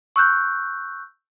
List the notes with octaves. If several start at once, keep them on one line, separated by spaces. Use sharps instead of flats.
C#6 E6 F#6 G6